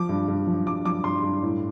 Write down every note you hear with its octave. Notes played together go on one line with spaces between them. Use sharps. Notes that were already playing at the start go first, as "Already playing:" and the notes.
Already playing: F3 D6
G2
G2
F3
G2 D6
F3 D6
G2 C6
G2
A2